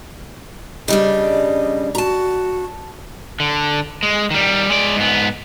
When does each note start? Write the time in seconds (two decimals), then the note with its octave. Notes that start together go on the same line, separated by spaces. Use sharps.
0.88 C#3 G3 D4 D#5
1.95 F#4 A5 A#5
3.40 D3
4.03 G#3
4.31 D#3 G3
4.69 G#3 D5
4.96 G#2 B3